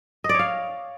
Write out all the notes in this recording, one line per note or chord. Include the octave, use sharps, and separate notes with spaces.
D#5
D5
C#5
F5